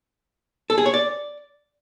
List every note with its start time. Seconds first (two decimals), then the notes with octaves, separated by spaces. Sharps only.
0.70 A4
0.78 G#4
0.86 C#5
0.94 D5